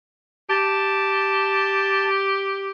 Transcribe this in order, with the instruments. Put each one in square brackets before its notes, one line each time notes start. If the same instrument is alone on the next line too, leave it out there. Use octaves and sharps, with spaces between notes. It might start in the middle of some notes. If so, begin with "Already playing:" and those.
[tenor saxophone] G4 [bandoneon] A5